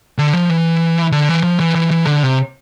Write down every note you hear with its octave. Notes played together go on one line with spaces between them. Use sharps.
D3
F3
E3
D3
E3
F3
E3
E3
E3
D3
C3